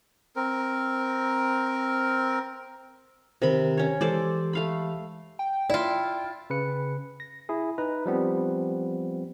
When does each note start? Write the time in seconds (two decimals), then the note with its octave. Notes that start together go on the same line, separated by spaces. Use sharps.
0.36 C4 A#4
3.42 C3 D#3 A#4 B5 A#6
3.77 C#4 C#5
4.01 E3 G#3 G4 A4 C5 D5
4.53 A3 F5 B5
5.39 G5
5.70 E4 F4 D5
6.50 C#3 B4 C#7
7.20 A#6
7.49 E4 G#4
7.78 D#4 B4 A#5
8.06 F3 G3 B3 C4